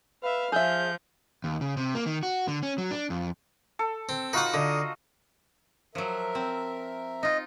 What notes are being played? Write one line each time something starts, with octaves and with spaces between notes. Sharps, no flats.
B4 E5 F5
F3 G#4 E5 F5 G6
D#2
C#3
C3
A#3
D#3
F#4
D3
C#4
F#3
D4
F2
A4
C4
D#4 F4 F#4 B4 F#5
D3 D#5
F3 F#3 A#4 E5
C4
D#4 F4 D#5